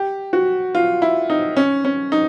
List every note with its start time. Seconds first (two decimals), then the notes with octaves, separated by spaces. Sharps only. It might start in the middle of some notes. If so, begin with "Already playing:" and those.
Already playing: G4
0.33 F#4
0.75 F4
1.02 E4
1.30 D#4
1.57 C#4
1.85 C#4
2.12 D#4